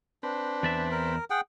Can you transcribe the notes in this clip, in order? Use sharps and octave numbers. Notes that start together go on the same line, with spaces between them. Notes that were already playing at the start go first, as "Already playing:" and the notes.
C4 D4 B4
E2 D5 E5
A#4
G#4 F#5 G5